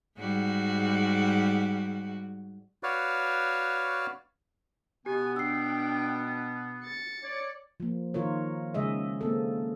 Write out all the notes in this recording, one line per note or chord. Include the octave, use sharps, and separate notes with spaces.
G#2 G3 F#4
F#4 B4 C#5 D5 F5
B2 B3 G4 G#5
D4 G5 E6 C7
A6 C#7
C#5 D5
F3 A#3
D#3 F4 A#4 C#5
C#3 G#3 G#4 D#5 E5
A#3 C4 A4